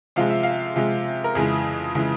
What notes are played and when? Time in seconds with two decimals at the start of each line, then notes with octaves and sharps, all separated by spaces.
0.16 C3 F3 G#3 F5
0.30 E5
0.43 F5
0.76 C3 F3 G#3
1.24 A#4
1.35 F2 C#3 E3 G#3 G#4
1.95 C#3 E3 G#3